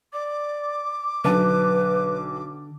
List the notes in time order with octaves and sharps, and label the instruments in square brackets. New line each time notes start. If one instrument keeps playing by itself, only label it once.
[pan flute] D5 [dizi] D6
[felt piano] B1 A5 [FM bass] D3 [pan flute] B4